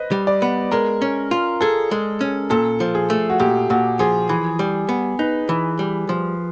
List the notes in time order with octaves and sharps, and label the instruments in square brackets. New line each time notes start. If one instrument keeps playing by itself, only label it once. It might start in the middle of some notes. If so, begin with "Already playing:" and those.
Already playing: [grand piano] B4 C5 D#5
[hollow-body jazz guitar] G3
[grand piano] D5
[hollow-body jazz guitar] B3
[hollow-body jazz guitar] G#3 [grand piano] A#4
[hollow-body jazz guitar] C#4
F4
[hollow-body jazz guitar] G#4 [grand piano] A4
[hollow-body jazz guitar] G#3
C#4
[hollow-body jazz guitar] A#2 [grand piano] A4
[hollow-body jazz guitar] F3
[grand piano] G#4
[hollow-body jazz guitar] A3
[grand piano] F#4
[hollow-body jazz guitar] A#2 [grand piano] G4
[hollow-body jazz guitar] A#2 [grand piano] F#4
[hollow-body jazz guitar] F3 [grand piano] G#4
[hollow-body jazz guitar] E3
G3
B3
[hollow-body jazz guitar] D#4 [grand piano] B4
[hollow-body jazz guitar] E3
G3
F3